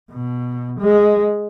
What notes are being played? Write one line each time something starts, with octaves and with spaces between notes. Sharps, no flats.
B2
G#3